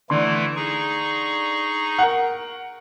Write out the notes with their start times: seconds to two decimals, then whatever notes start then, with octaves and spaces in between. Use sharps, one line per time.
0.10 D3 E3 A3 E4 C6
0.56 D#4 G#4 C#6
1.99 A#4 F#5